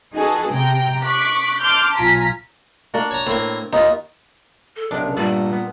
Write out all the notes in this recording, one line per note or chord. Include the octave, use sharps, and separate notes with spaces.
D#4 F#4 G#4 A4 B4
C3 G5 A#5
C#6 D6 F#6 B6
A5 C6 D6 F6 G6
B1 F4 G#5 A#5 B6
A#3 D4 F#4
C#5 A5 A#5
A2 A#3 C4
D#2 D#4 F4 B5
A4
B1 C3 D4 D#4 A#4
C#3
G2 A#2 G3 A3 B3 D5
B3